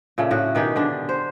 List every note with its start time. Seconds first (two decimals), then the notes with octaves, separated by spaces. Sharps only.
0.18 A#2 C#3 A3
0.31 A2 F#4
0.55 B2 D#3 G4 G#4
0.76 D3 D4
1.09 C5